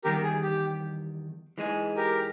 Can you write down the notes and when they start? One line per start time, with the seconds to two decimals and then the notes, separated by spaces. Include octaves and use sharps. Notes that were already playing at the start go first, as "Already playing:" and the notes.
0.04 E2 D#3 G3 G4 A#4
0.23 G#4
0.43 G4
1.58 E3 G#3 D#4 G#4
1.96 G4 A#4